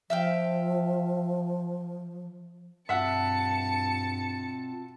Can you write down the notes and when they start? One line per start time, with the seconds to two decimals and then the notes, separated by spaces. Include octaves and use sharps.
0.10 F3 E5 F5 G5
2.89 G2 B2 C4 F4 E5 F#5 A5 C#7